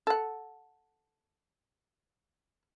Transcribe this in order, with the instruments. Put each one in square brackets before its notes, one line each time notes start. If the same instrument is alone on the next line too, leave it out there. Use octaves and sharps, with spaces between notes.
[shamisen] A4 F#5